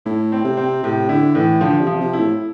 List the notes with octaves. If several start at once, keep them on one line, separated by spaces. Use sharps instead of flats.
A2 E4
C4
C3
C4
A2 C3
D3 E4
A2 E3
D3 F3
C3
F3
C3
E4
A2